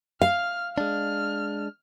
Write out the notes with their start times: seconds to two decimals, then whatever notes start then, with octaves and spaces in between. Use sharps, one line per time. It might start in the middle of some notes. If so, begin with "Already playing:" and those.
0.22 F5 F6
0.78 G#3 D4 F6